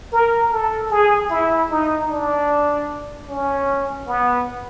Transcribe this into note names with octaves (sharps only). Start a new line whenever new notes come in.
A#4
A4
G#4
E4
D#4
D4
C#4
B3